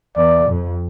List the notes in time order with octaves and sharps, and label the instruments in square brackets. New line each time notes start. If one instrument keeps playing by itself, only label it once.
[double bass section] E2 [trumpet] D5
[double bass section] F2